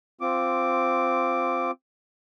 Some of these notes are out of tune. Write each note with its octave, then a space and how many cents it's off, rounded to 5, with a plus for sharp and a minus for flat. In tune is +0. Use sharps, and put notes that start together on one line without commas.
C4 -5 F4 +0 D6 +0